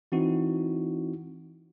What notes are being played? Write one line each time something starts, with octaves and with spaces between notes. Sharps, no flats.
E3 C4 D#4 E4 F#4